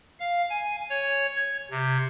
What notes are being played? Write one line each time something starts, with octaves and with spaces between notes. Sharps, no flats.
F5
G#5
C#5
G#6
C3